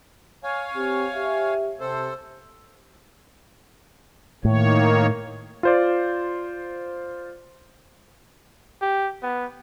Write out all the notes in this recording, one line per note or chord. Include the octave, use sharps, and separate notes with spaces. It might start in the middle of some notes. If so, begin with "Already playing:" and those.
C#5 F5 G#5
C4 G4
G4 E5
C3 A4 C5
A2 D#3 A#3 C#5
F4 C5 D5
G4
B3